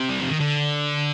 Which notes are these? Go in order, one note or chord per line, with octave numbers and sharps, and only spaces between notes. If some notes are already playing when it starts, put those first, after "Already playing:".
Already playing: C3
G3
F3
D#3
D3